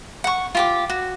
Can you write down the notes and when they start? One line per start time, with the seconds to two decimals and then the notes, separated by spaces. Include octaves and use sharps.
0.24 F#5 C#6
0.55 F4 G4 D6
0.90 F#4